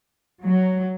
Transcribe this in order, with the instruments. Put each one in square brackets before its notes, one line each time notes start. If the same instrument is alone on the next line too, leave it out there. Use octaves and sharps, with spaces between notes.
[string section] F#3